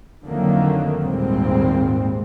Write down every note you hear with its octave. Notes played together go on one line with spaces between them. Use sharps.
F2 D3 D#3 F#3 A3 A#3
G#1 D#2 A#2 G3 G#3 C4